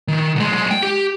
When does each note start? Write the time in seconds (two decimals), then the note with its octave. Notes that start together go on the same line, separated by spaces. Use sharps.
0.08 D#3
0.36 B1 G#3
0.71 G5
0.82 G4